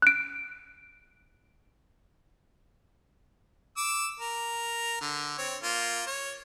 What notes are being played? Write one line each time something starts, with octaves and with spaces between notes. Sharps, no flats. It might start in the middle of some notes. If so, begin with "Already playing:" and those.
F#6 D7
D6 E6
A#4
D3
C4 C#5
A#3 F4
C#5